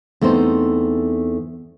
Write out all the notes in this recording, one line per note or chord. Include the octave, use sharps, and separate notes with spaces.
E2 A3 C4 D#4 C5